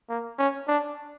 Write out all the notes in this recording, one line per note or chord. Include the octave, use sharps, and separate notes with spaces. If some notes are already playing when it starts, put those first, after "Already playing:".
A#3
C#4
D4